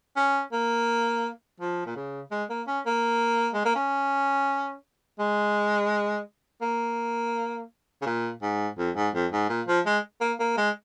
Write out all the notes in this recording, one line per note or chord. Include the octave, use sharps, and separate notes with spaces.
C#4
A#3
F3
A#2
C#3
G#3
A#3
C#4
A#3
G#3
A#3
C#4
G#3
A#3
C#3
A#2
G#2
F2
G#2
F2
G#2
A#2
F3
G#3
A#3
A#3
G#3